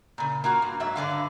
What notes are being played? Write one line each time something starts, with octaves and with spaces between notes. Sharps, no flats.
A#2 C#3
A#3 F4 F#4
G2
G#2 F#3 E5
G2 D3 G#3 F5